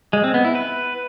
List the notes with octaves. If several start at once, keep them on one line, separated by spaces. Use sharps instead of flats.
G#3
C4
B3
E4
B4